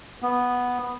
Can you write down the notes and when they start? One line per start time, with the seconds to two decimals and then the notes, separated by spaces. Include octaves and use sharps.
0.22 B3